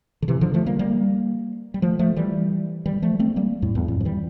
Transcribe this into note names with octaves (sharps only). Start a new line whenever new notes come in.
D3
C3 E3
D3 F3
F3 A3
G3 A#3
G3 A#3
G3
F3 A3
F3 A3
E3 G3
E3 G3
F3 A3
A3 C4
G3 A#3
F2 A2
E2 G2
F2 A2
F3
E3 G3